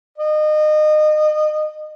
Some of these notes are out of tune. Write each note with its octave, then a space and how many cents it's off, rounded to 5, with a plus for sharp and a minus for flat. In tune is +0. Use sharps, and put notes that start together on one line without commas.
D#5 -30